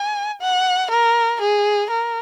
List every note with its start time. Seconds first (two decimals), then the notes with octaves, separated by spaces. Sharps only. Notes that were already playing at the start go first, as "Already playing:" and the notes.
Already playing: G#5
0.41 F#5
0.91 A#4
1.41 G#4
1.90 A#4